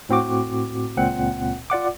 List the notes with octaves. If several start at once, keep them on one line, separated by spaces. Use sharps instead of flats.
A2 C4 F#4 D6
C#2 A#2 C4 F#5
F4 D5 F#5 D6